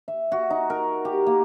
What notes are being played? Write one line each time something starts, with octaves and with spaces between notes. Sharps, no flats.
E5
F#4
D#4
A#4
G4
A#3